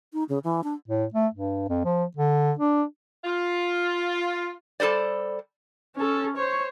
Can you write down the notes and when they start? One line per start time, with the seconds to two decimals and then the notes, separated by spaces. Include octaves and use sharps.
0.13 D#4
0.29 C#3
0.44 E3
0.64 D4
0.88 A2
1.14 A3
1.34 G2
1.69 F2
1.85 F3
2.17 D3
2.59 D4
3.25 F4
4.80 G3 A4 A#4 C5 D5
5.96 C#4 A4
6.37 C5 C#5